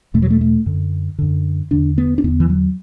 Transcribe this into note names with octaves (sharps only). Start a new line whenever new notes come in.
E2 B2 A3
F#3
A3
A3
F#2 D3
F#2 D3
E2 D3 D4
B3
D4
E2 D3 B3
E3
F#3